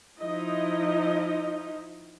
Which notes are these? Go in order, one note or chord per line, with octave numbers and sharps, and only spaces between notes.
F3 D#4 E4 D#5